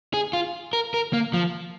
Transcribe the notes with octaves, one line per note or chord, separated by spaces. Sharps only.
G#4
F4
A#4
A#4
A#3
F3